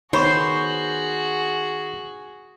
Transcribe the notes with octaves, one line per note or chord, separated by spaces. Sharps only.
D#3 B3 F#4 G#4 C5 C#5 B5 C#6